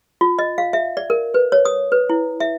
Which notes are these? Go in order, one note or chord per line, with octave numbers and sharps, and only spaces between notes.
F4
D#5
F5
E5
D5
A#4
B4
C#5
D#6
B4
E4
E5